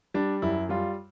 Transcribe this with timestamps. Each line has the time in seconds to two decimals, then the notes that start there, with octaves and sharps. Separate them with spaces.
0.14 G3 D4
0.42 F#2 E4
0.69 G3 F4